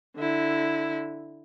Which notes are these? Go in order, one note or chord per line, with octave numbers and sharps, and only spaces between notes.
D3 E4